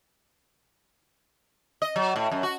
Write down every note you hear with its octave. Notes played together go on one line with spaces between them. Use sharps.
D#5
F#3
A2
F#2
F#4